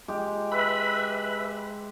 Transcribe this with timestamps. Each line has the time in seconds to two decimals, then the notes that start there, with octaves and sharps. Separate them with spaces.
0.08 G#3 G4
0.52 B4 E5 B5